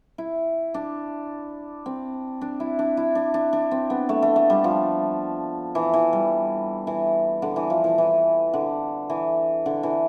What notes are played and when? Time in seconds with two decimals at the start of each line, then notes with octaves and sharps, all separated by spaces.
0.18 E4
0.74 D4
1.86 C4
2.41 D4
2.60 E4
2.79 D4
2.97 E4
3.15 D4
3.34 D4
3.53 D4
3.71 C4
3.90 B3
4.09 A3
4.22 A3
4.36 A3
4.50 G3
4.64 F3
5.75 E3
5.93 E3
6.13 G3
6.87 E3
7.42 D3
7.56 E3
7.70 F3
7.84 E3
7.98 E3
8.54 D3
9.10 E3
9.66 D3
9.83 E3